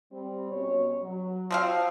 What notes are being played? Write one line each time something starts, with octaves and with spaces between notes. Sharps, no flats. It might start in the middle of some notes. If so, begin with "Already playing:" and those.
G3 C4
B2 C#4 C#5
F#3
F3 C4 F5